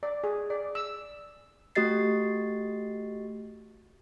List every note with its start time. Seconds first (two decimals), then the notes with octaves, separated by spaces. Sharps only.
0.03 D5
0.24 G#4
0.50 D5
0.75 E6
1.75 A3 F#4 G4 D#5 A6 C7